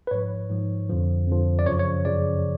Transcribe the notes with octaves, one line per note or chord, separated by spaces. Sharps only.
B4
G#2 F3 C#5
G#2 F3
F2 D3 F3
F2 D3 F3
D5
F#2 C#3 F3 C#5
C#5
F#2 C#3 F3 D5